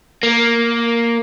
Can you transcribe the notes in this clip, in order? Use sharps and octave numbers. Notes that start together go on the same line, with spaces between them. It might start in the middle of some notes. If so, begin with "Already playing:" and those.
A#3